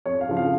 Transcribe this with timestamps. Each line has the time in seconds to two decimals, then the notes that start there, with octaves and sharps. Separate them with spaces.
0.06 F2 C#5
0.21 F5
0.29 C#3 F3
0.37 F5